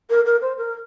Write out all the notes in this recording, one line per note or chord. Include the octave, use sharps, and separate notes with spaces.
A#4
A#4
C5
A#4